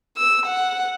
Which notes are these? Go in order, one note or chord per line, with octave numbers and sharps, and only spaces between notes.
E6
F#5